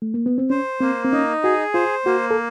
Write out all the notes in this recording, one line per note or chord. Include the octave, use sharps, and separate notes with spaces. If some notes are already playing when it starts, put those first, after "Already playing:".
A3
A#3
B3
C4
C#4 C5
A#3 C4
C4
C#4 D#4
F#4 G#4
F4 C5
A#3 F#4
A4